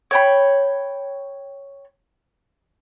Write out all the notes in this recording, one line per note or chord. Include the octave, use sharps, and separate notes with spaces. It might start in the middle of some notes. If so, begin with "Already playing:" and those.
C#5 G5 B5